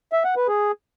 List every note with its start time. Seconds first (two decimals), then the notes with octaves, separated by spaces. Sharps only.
0.13 E5
0.24 F#5
0.36 B4
0.48 G#4